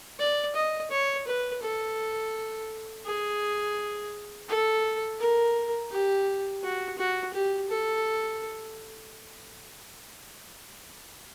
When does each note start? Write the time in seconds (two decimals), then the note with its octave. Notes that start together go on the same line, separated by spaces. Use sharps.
0.19 D5
0.56 D#5
0.91 C#5
1.27 B4
1.62 A4
3.06 G#4
4.49 A4
5.20 A#4
5.91 G4
6.63 F#4
6.98 F#4
7.34 G4
7.70 A4